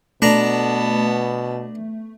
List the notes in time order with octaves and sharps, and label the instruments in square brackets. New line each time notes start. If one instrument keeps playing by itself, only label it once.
[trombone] B2 [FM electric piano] A3 [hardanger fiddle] B3 A5 [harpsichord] D4 A#5